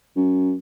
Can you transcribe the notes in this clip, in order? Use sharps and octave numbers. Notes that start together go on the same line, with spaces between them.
F#2